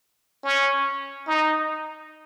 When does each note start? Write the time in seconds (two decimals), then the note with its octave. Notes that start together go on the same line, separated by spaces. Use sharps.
0.44 C#4
1.27 D#4